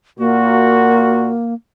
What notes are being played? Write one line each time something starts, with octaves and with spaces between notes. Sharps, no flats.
A#2 A#3 F#4